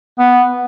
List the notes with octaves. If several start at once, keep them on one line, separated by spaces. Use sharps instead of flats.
B3